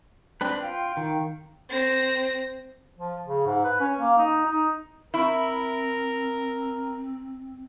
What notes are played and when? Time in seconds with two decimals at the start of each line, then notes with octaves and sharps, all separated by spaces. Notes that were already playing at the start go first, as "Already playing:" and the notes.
0.41 C4 D4 B4
0.62 F4 F5 G5
0.97 D#3
1.69 C4 A#6
2.98 F3
3.26 C#3
3.46 G#2
3.64 B4
3.80 C#4
4.00 A#3
4.18 D#4
4.45 D#4
5.14 C4 E4 A#4